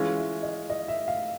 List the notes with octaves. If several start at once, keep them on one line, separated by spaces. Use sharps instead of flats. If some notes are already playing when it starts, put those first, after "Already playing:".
Already playing: E3 G#3 C#4 F4 F5
E5
D#5
D#5
E5
F5